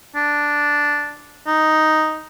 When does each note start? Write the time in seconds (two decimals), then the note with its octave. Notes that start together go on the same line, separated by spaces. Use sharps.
0.16 D4
1.47 D#4